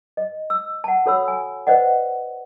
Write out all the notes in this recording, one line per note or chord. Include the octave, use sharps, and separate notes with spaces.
D#5
E6
F#5 A5
F#4 A4 C#5 B5 E6
G#5
B4 C5 D5 D#5 F#5